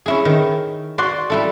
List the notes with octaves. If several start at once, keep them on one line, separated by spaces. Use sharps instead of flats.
C#4 E4 G#4
D#3
F#4 D5 C6
G3 E4 A4